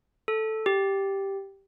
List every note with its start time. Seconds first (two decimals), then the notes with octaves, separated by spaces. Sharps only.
0.28 A4
0.66 G4